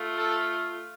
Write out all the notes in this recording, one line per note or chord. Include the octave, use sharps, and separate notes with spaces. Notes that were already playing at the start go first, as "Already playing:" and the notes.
Already playing: A3 F4
A4